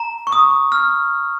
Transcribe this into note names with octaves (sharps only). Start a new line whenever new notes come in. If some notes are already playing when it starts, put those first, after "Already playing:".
Already playing: A#5
C#6
D#6
F6